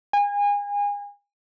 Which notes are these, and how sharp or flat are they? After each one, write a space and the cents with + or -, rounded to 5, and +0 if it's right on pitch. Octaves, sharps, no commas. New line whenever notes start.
G#5 -30